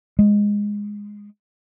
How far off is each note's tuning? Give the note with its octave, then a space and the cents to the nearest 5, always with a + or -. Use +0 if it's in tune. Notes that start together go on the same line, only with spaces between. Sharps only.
G#3 -10